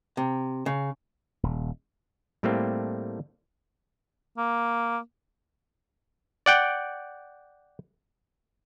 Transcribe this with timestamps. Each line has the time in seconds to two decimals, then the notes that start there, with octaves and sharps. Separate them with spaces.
0.17 C3
0.66 C#3
1.43 D#1
2.43 A2 G3 A3 A#3 C4
4.37 A#3
6.46 D5 F#5 G5